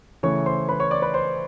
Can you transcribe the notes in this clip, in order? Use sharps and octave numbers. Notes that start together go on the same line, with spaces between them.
C#3 E3 A3 C#5 C#6
C5 C6
B4 B5
C#5 C#6
D5 D6
B4 B5
C5 C6